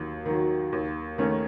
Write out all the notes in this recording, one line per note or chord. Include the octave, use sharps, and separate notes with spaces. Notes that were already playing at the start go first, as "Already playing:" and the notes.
Already playing: D#2 F#3
D#3 F#3
D#2
D#3 A3 C#4